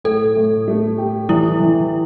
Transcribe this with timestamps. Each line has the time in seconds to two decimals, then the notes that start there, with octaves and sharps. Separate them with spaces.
0.04 A2 A4
0.37 A2
0.68 A3
0.98 G4
1.29 E3 E4
1.60 E3